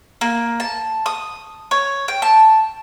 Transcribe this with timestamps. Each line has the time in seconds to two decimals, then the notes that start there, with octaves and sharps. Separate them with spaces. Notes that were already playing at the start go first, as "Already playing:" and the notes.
0.21 A#3
0.60 A5
1.06 D#6
1.71 C#5
2.08 G5
2.22 A5